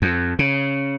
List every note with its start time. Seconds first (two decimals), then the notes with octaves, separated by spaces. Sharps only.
0.02 F2
0.39 C#3